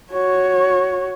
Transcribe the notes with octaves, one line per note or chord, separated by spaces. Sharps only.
F#4 C#5